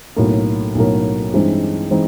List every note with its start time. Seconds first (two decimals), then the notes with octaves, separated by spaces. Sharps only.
0.16 B1 A2 F#3 A#3
0.75 B1 A2 F#3 A#3
1.33 G2 E3 G#3 C4 D#4
1.91 E3 G#3 C4 D#4